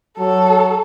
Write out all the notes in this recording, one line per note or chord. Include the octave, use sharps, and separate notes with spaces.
F#3 A4